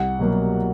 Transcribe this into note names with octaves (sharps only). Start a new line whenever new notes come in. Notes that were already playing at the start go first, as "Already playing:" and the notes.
Already playing: C2 F#5
B2 F#3 A#3